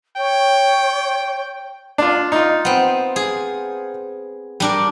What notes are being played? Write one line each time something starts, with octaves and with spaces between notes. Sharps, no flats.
C#5 G5
D4 F4
D#4 F4
B3 C4
G#4
G3 D4 A#4